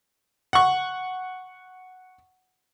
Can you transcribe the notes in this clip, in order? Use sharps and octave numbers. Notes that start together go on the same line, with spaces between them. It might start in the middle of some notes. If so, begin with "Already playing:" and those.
F#5 C#6